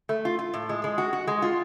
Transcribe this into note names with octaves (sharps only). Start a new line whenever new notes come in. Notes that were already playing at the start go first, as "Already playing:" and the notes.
A3
F4
F4
A2
G#3
G#3
F#4
F#4
G#3
F4